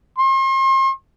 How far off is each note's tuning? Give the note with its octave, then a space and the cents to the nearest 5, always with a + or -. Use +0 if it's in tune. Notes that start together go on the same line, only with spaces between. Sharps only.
C6 +40